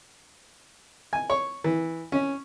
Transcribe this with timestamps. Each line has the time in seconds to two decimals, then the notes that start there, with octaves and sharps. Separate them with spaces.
1.13 G#5
1.30 C#5
1.64 E3
2.12 C#4